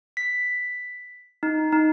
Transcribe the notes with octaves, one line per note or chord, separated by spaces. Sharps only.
B6
D#4
D#4